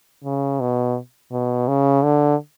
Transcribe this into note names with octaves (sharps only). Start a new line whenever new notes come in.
C#3
B2
B2
C#3
D3